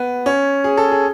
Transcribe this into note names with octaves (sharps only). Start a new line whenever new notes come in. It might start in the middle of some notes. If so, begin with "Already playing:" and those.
Already playing: B3
C#4
G#4
A4
G#4